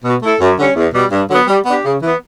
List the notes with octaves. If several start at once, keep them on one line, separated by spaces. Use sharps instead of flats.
B2
A3 E4 A4
F#2
D3 G3 C#4
E2
B2 G3
G2
D3 F#3 B3
G3
B3 D4 G4
C#3
E3 B3